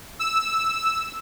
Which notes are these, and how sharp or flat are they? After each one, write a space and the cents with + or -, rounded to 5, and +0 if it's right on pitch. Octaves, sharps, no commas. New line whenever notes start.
E6 -5